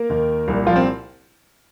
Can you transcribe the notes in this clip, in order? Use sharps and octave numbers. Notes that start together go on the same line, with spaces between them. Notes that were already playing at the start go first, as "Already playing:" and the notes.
Already playing: A#3 A#4
D#2 D#3
C2 A#2
F3 F4
C4